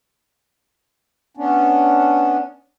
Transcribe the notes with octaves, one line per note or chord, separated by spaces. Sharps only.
B3 C#4 D4